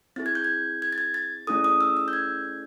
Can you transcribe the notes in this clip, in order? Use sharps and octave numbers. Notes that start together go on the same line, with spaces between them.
C4 E4 G#4 A6
G#6
G6
G#6
G#6
A6
G#6
A6
A3 C#4 E4 G#4 D#6
D#6
E6
E6
G6
G#6